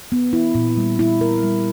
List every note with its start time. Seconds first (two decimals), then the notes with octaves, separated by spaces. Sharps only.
0.12 B3
0.33 E4
0.55 A#2
0.77 G3
0.99 E4
1.21 A#4
1.43 G3